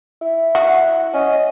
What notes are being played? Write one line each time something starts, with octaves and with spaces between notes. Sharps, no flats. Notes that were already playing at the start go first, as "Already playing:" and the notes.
E4
F#4 F#5
C#4 D#5